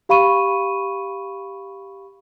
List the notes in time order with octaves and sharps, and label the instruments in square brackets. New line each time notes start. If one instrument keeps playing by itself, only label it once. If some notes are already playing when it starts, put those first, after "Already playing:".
[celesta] G4 F5 B5 C#6 D#7